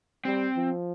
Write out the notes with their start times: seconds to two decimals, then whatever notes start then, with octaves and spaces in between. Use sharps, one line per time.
0.25 G3 C4
0.56 F3